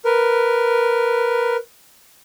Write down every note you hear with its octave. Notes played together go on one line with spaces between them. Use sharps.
A#4 B4